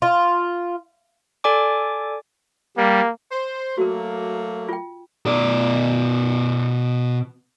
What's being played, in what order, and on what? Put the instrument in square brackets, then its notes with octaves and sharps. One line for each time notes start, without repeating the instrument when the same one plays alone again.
[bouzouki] F4
[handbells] A4 D5 G#5 D6
[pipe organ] G3 [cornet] A#3
[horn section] C5
[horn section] F#3 A3 A#3 [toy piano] F#4 A#4
[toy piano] F4 G5
[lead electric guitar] B2 D5